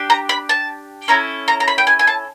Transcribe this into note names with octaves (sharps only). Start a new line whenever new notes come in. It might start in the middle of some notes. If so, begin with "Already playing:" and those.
Already playing: D4 G4
A#5
B5
A5
C#4 E4 A4 A#5
A#5
A#5
B5
G5
G#5
G#5
A5